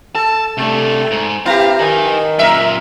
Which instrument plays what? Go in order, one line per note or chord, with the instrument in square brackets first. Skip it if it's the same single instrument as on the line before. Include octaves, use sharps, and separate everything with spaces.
[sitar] A4 [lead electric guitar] A5
[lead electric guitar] C3 D4 [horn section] A3
[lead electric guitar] G#2
[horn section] C4 B4 A#5 [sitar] E4 G4 [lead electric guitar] F5
[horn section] D#3 [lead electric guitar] B4 G#5
[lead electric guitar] F#2 A#2 [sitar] A#4 E5